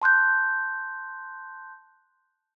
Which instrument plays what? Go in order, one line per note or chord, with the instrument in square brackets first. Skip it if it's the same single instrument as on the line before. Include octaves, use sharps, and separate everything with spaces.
[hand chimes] A5 C6 F#6 G6